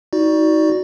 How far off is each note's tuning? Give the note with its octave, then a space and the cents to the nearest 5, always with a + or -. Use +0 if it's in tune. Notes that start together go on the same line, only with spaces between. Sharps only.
D#4 +30 F#4 +0 D5 +0